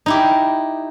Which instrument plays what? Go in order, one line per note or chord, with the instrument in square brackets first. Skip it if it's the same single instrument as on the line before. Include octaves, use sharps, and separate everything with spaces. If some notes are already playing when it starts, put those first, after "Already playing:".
[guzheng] D#4 E4 G4